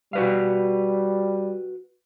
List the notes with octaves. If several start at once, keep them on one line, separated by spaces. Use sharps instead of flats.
G3 F#4 B4 F5